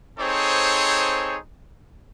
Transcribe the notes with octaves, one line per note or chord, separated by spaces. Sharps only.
C4 D#4 G#4 A4 C5 C#5